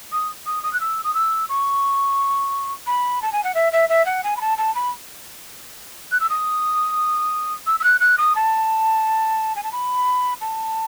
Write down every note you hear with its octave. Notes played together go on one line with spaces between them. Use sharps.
D#6
D#6
D#6
F#6
E6
D#6
E6
C#6
B5
A5
G#5
F#5
E5
E5
E5
F#5
G#5
B5
A5
A5
B5
F#6
E6
D#6
E6
E6
F#6
F#6
D#6
A5
G#5
A5
B5
A5